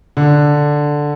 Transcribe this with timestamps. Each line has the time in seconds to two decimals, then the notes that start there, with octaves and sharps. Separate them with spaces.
0.17 D3